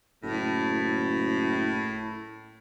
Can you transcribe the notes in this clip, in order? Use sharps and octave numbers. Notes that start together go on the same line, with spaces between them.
F#1 A2